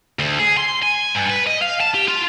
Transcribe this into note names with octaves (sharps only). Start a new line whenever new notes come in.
D2
G#4
C6
G#5
G2
B4
D#5
F5
A5
G4
F4